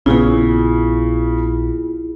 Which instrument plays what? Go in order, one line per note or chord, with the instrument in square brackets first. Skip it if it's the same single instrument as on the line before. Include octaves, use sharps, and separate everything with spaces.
[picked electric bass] A#1 B3 [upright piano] C#3 [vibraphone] E4 F4 G#4